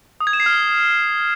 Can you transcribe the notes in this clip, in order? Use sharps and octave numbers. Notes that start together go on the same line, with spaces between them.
D#6
G#6
E7
C7
F6